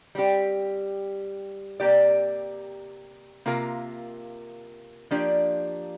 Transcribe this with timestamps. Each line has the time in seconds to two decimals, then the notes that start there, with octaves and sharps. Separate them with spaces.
0.15 G3 C4 G4
1.80 C3 A#3 G4 D5
3.46 C3 A#3 F4 A#4 F5
5.11 F3 A#3 D4 G4 D5